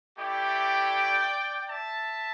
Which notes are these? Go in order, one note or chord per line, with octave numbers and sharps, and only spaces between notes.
A3 E4 G4 D5 G5
E5 A5